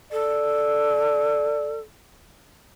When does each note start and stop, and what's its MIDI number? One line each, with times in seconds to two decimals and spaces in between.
0.12 1.80 69
0.12 1.78 74